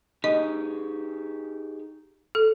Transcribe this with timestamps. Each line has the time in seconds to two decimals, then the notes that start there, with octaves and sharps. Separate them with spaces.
0.24 D#4 G4 G#4 D#5
2.35 A4